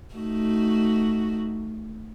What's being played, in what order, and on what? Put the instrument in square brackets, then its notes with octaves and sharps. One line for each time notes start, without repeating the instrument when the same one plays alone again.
[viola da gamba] A3 D#4 F#4